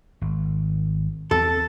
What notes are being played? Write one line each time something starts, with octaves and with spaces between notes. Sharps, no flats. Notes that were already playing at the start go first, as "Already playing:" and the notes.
G#1
E2 C4 A4 A5